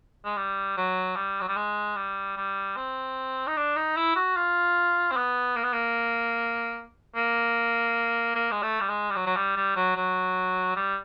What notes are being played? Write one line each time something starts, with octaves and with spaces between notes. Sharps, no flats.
G#3
G3
F#3
G3
F#3
G3
G#3
G3
G3
C4
D#4
D4
D#4
E4
F#4
F4
C4
B3
A#3
B3
A#3
A#3
A#3
G#3
A3
G3
G#3
G3
F#3
F#3
G3
G3
F#3
F#3
G3